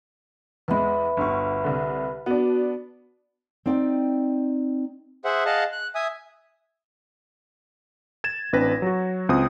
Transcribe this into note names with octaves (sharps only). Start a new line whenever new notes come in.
E2 G#3 B4 E5 B5
G1 D2 C#6
C2 D3
B3 D4 F#4
C4 D#4 D5 G5
G#4 C5 E5 F#5
G#4 D#5 F5 F#5 A5
F#6
E5 G#5 D#6
G#6 A6 E7
A1 C4 D4 B4 A#6
F#3 F#4
C#2 C4 D#6